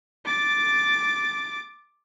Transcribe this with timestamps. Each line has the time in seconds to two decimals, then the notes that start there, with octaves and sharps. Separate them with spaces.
0.25 D6 A6